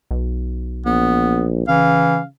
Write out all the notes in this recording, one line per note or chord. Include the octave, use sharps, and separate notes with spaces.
B1
A#1 B3
C#3 E3 F5